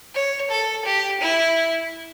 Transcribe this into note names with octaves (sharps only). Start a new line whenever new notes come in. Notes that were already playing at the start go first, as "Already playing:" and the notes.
C#5
A4
G4
E4